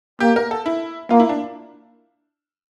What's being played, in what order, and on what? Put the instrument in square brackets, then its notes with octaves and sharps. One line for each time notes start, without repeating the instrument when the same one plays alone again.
[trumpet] A#3 [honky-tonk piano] G4
[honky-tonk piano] A#4
A4
E4
[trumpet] A#3 [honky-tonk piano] F4
[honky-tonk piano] E4
D4